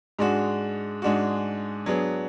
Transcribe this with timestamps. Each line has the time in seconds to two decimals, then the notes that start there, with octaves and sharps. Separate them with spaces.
0.19 G#2 G#3 D4 F#4
1.02 G#2 G#3 D4 F#4
1.86 F#3 B3 D4 G#4